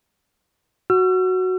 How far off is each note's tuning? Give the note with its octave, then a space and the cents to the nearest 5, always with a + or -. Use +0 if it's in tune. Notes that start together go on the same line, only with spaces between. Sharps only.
F#4 +0 E6 +45